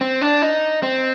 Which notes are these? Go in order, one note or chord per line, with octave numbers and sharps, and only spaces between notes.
C4
D4
D#4
C4